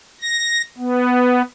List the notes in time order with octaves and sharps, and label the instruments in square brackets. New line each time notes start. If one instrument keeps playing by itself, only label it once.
[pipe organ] A#6
B3